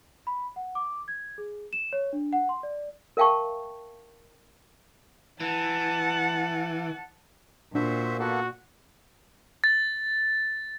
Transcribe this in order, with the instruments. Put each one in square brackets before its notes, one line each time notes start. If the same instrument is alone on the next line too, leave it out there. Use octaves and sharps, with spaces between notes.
[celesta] B5
F#5
D6
G#6
G#4
E7
C#5
D4
F#5
C6
D5
[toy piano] A#4 E5 F5 G5 A5 C#6
[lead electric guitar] E3 [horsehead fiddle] F#5 A5
[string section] A#2 [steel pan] D4 [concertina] F#4 C5 E5
[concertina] A#3 B3 A4 [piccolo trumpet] F#4
[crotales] A6